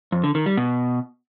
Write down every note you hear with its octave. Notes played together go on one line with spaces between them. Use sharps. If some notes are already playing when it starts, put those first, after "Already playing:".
F2
D3
D#3
G3
B2